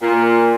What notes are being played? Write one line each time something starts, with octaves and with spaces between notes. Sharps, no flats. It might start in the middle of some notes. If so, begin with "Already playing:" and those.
A#2